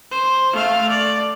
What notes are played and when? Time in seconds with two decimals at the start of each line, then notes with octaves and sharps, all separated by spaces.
0.11 C5
0.54 A3 F5
0.90 D5